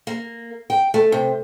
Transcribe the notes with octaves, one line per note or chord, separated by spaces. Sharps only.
A#3
G5
A3
C3